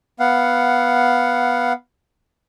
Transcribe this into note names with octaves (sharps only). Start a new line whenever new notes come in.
B3 F5 F#5